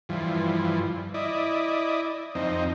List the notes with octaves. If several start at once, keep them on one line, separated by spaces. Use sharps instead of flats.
G2 E3 F3
E4 D5 D#5
F2 C4 D#4